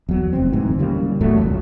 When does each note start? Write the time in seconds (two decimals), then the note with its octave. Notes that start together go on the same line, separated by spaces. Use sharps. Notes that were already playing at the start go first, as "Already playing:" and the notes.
0.09 E2 F#3
0.33 F1 C4
0.52 D1 G#2 E3
0.79 C#3 G3 A#3
1.21 E2 A2 F#3 A3
1.41 G1 C#2 F#2